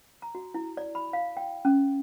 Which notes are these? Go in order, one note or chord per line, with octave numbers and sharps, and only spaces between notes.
A#5
F#4
E4
D5
B5
F5
G5
C#4